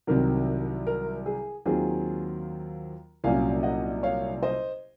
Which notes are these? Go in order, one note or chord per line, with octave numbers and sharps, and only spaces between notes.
C2 C3 D#3 F#3 A#4
A#4
G#4
D#2 D#3 F#3 C4 F4 G#4
C2 A#2 F#3 C#4 F5 G#5
D#5 F#5
C#5 F5
C5 D#5